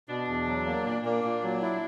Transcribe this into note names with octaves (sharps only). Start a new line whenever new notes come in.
B2 D4
E2
F#3
A#3
A#2 D4
A#3
A#2
F#3
E4